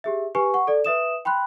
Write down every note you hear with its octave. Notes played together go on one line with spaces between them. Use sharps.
G4 G#4 E5
G4 B4 G#5 C#6
F#5 C#6
A4 D5
B4 E5 D#6 E7
G5 B5 C6 F#6